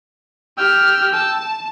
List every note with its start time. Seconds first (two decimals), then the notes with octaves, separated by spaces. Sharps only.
0.57 G4 G5 E6 F6
1.13 A5